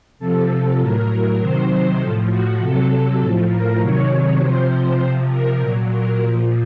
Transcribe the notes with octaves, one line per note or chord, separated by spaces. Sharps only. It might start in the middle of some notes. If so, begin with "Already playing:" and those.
C3 F3 A4
A2 F#3 A#4
C3 D#3 F#3 C5
A2 F3 A4
F#4
C3 F#3 A4
A2 F3 A4
A#4
C3 D#3 F#3 C#5
C3 F3 C5
C3 F3 C5
A#4
A#2 F#3 A#4
A#4
A#2 F3 A#4